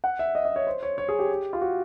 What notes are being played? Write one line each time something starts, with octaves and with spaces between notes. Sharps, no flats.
F#5
E5
D#5
D#5
C#5
C5
C#5
C#5
G#4
G4
F4
F#4